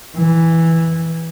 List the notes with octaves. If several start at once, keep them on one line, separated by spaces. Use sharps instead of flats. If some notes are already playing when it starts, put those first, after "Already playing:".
E3